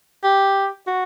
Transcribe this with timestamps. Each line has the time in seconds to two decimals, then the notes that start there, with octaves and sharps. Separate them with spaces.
0.24 G4
0.87 F#4